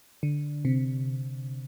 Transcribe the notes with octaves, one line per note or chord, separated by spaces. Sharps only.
D3
C3